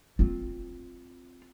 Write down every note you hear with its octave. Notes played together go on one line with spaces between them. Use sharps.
C4 F4